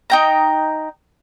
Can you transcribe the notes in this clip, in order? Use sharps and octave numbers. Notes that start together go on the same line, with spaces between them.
D#4 G5 A#5